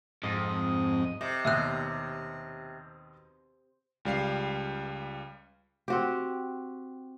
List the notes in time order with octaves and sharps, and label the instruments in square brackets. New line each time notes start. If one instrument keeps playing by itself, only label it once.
[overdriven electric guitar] F2 [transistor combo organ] G#2 D#5
[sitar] C3 [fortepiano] D#5
[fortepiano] D#2 B2 [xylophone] E5 F#6
[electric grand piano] C#2 G3 F5 C7
[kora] C4 F#4 G4